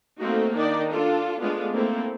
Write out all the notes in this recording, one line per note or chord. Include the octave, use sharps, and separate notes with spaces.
A3 A#3 C4 D#4 F#4
D#3 D4 D#4 D5
D4 F4 A4
G#3 A3 B3 D4 F4
A3 A#3 C4 E4 A4